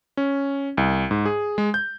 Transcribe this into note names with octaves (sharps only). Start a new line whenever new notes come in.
C#4
C2
G#2
G#4
G#3
G6